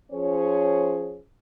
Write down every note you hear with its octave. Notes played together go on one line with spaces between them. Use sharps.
F3 C#4 G#4 C5 C#5